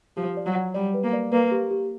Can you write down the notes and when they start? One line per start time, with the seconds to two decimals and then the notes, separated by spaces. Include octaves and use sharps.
0.17 F3 G4
0.37 D5
0.46 F#3
0.55 F#5
0.74 G3 D5
0.94 B4
1.04 A#3
1.13 D5
1.32 A#3 B4
1.51 G4
1.71 G4